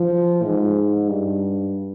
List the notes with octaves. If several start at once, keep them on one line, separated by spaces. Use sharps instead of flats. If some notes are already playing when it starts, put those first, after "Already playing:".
Already playing: F3
G#2
G2